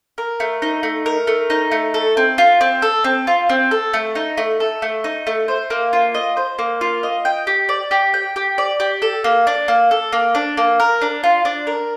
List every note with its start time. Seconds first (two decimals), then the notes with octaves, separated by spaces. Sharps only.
0.18 A#4
0.40 A3
0.62 D#4
0.83 A3
1.06 A#4
1.27 A3
1.50 D#4
1.71 A3
1.94 A4
2.17 C4
2.38 F4
2.61 C4
2.82 A4
3.04 C4
3.27 F4
3.49 C4
3.71 A4
3.94 A3
4.15 D#4
4.37 A3
4.60 A4
4.82 A3
5.04 D#4
5.27 A3
5.48 C5
5.70 A#3
5.93 F4
6.14 D#5
6.37 C5
6.59 A#3
6.81 F4
7.03 D#5
7.25 G5
7.47 G4
7.69 D5
7.91 G4
8.14 G5
8.36 G4
8.58 D5
8.80 G4
9.02 A4
9.24 A#3
9.47 D4
9.68 A#3
9.91 A4
10.13 A#3
10.35 D4
10.57 A#3
10.80 A#4
11.02 D4
11.24 F4
11.45 D4
11.67 A#4